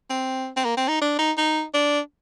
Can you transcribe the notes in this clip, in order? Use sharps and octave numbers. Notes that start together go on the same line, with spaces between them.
C4
C4
A#3
C4
D#4
D4
D#4
D#4
D4